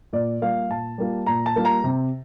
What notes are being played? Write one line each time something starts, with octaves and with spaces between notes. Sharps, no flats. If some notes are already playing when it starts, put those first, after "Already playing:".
A#2 D5
G3 A#3 F4 F5
A#2 A5
G3 A#3 F4
A#2 A#5
A5
G3 A#3 F4
A#5
C3